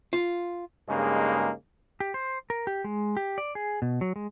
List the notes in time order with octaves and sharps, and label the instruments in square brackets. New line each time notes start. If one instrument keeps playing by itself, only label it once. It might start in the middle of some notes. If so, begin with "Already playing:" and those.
[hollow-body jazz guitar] F4
[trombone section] G2 C#3 G#3 A#3 D#4
[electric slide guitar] G4
C5
A#4
G4
G#3
G4
D5
G#4
B2
F#3
G#3